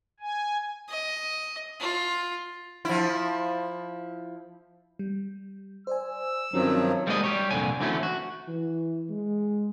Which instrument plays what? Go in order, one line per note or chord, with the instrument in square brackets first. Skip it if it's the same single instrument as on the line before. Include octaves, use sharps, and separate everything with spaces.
[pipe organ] G#5
[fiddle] D#5
F4
[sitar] F3 E4
[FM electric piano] G3
[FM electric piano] C5 D5 G#5 [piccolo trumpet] E6
[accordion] G2 D#3 F3 [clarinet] F#3 [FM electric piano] C4 C#4 F#4
[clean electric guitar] G3 G#3 A#3 B3 E4 D#5
G3 G4 C#5
C2 F2 A#2 D3 G#5
D3 E3 F#3 A3 C4 C#4
F#4
[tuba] E3
G#3